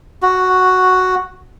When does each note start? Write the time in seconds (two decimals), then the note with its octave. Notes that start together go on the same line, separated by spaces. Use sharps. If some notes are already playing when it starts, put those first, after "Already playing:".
0.22 F#4